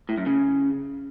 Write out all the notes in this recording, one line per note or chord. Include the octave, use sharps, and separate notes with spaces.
A2
F#2
C#3